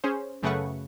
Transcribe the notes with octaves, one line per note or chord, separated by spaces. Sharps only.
C#4 G#4 C5
F#2 C#3 A3 B4 F#5 C#6